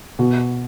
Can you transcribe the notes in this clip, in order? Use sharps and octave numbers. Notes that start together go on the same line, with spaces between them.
B2